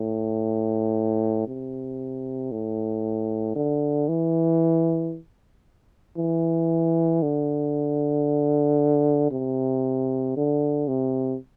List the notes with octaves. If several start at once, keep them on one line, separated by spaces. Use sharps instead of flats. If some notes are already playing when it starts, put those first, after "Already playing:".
Already playing: A2
C3
A2
D3
E3
E3
D3
C3
D3
C3